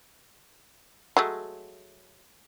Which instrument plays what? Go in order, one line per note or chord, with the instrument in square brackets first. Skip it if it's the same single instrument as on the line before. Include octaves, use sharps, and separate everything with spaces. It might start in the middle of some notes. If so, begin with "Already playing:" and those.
[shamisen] F#3 G#3 A3